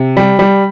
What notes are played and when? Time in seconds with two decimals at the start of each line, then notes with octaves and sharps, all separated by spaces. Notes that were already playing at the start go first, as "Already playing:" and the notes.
Already playing: C3
0.17 G3
0.39 G3